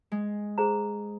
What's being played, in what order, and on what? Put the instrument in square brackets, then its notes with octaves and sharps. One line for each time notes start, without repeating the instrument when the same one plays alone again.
[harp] G#3
[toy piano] G#4 C5 A#5